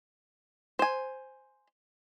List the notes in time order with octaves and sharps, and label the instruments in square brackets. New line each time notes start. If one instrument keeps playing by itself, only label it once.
[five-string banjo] C5 G#5